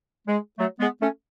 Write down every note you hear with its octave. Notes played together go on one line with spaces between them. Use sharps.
G#3
F#3 A3
G#3 B3
A3 C#4